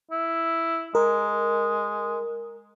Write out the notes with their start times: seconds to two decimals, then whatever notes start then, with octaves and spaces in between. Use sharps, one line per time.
0.11 E4
0.95 G#3 A#4